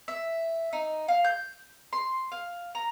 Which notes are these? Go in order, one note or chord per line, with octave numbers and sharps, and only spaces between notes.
E5
D#4
F5
G6
C6
F5
A#5